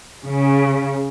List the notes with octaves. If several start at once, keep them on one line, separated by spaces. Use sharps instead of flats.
C#3